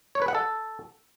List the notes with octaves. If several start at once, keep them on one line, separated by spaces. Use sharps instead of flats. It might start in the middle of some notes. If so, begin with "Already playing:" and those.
C#5
B4
F#5
A4